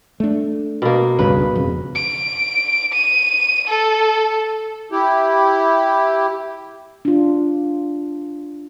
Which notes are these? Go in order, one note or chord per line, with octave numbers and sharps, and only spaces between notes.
A3 D4
B2 A#3
C#2 G2 C#3 B4
E1 F2 C#3
D7
D#7
A4
E4 G4
D4 F4